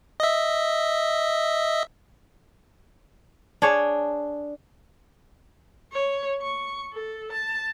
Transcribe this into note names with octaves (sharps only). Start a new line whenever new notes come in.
D#5 E5
D4 G#4 C#5
C#5
C#6
A4
A5